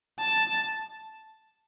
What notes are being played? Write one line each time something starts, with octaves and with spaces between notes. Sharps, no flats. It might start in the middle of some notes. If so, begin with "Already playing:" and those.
A5